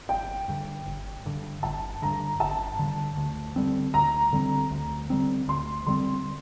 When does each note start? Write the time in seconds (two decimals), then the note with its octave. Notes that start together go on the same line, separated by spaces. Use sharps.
0.09 G1 G5
0.48 G2 D3
0.86 G1
1.25 G2 D3
1.63 G1 A5
2.02 G2 D3 A#5
2.40 G1 A5
2.79 G2 D3
3.17 D2
3.56 D3 G3 C4
3.94 D2 A#5
4.33 D3 G3 C4
4.71 D2
5.10 D3 G3 C4
5.48 D2 C6
5.87 D3 G3 C4 C6